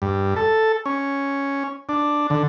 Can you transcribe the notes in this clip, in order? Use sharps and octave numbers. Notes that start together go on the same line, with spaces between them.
G2
A4
C#4
D4
D3